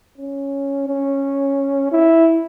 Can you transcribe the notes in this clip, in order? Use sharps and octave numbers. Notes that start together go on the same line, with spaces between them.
C#4
C#4
E4